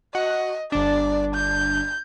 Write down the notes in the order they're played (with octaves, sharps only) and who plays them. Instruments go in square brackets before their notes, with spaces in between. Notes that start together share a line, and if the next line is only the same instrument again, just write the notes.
[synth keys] F#4 F#5 [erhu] D#5
[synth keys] G1 D4 [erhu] D5
[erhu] G6